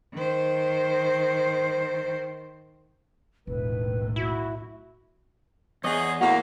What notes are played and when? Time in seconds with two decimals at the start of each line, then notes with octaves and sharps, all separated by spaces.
0.14 D#3 C5
3.47 E1 B1 A2 D#3 B4
4.16 E4 F#4
5.84 E2 G#4 C#5 D#5
6.21 E2 A2 A#3 F#4